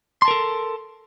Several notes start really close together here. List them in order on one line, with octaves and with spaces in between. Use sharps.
C6 A5 A#4 A4